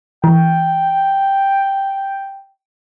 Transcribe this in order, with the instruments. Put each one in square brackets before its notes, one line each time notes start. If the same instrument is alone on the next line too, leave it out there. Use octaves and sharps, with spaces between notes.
[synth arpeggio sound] E3 [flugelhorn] G5